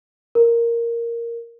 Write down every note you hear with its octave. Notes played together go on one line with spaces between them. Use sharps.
A#4